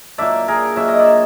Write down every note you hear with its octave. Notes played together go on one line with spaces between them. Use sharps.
A#2 F#3 A#3 D4 D5 E5
G#4 A#4
A#2 F#3 A#3 D4 E5
D#5
D5 E5